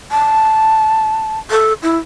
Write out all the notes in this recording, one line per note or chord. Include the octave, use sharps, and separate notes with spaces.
A5
A4
E4